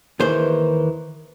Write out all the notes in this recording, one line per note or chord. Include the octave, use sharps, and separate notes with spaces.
D#2 D#3 E3 G#4 C5